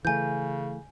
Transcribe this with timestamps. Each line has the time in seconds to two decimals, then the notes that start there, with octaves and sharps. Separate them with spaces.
0.05 C#3 E3 A3 G#5 G6